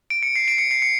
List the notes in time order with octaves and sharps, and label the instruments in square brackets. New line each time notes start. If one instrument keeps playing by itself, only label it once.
[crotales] D7
C#7
C7
D7
C#7
C7
C#7